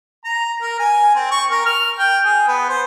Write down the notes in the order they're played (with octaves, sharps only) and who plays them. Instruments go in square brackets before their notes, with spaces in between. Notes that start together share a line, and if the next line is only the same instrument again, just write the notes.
[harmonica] A#5
A#4
G#5
C4
C#6
A#4
F6
G5
G#4
B3
C5